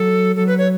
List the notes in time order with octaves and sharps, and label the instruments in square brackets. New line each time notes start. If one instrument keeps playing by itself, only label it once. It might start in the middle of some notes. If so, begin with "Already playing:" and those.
Already playing: [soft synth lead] F#3 [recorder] A4
[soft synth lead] F#3 [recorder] A4
[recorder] B4
C#5